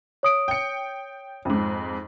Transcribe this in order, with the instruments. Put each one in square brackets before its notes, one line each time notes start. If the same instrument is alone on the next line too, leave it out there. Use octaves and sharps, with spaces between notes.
[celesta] C#5 D#6 D7
[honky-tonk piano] G5 C#7
F2 G#2